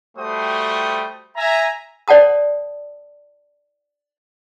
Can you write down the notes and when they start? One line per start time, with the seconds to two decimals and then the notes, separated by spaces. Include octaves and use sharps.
0.17 G3 A3 F#4 C5 G5 D#6
1.37 E5 G#5 A#5
2.08 C5 D5 F#5 A5 D#6